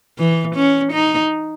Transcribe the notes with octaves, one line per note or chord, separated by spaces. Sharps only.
E3
C#4
D#4